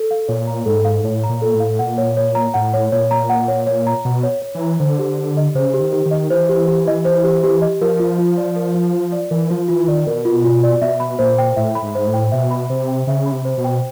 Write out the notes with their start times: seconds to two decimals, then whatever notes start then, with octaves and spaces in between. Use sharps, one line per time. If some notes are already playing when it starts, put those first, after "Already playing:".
Already playing: A4
0.11 F5
0.28 A#2 C#5
0.47 A#5
0.66 G#2 A4
0.85 F5
1.03 A2 C#5
1.23 A#5
1.29 A#2
1.42 A4
1.54 A2
1.60 F5
1.79 A#2 F#5
1.98 C#5
2.17 C#5
2.35 A#5
2.54 A2 F#5
2.74 C#5
2.92 A#2 C#5
3.11 A#5
3.29 F#5
3.48 C#5
3.67 C#5
3.87 A#5
4.05 B2 F#5
4.23 C#5
4.42 C#5
4.55 E3
4.61 A#5
4.80 D3 C5
4.99 G4
5.18 G4
5.37 D#5
5.55 C#3 C5
5.74 G4
5.80 D#3
5.93 G4
6.06 D#3
6.11 D#5
6.30 E3 C5
6.49 G4
6.68 G4
6.88 D#5
7.05 C5
7.24 G4
7.44 G4
7.62 D#5
7.81 F3 A#4
8.00 F4
8.19 F4
8.37 D5
8.56 A#4
8.75 F4
8.93 F4
9.12 D5
9.31 E3 A#4
9.50 F3 F4
9.68 E3 F4
9.88 D#3 D5
10.07 B2 A#4
10.25 F4
10.44 F4
10.64 D5
10.81 B2 E5
11.00 B5
11.19 A#2 C5
11.38 G5
11.56 A2 E5
11.75 B5
11.83 G#2
11.95 C5
12.07 A2
12.14 G5
12.32 B2 E5
12.51 B5
12.70 C3 C5
12.88 G5
13.07 C#3 E5
13.26 B5
13.32 C3
13.45 C5
13.58 B2
13.64 G5